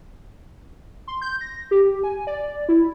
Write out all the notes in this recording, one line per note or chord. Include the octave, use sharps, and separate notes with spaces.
C6
G6
A#6
G4
G#5
D5
E4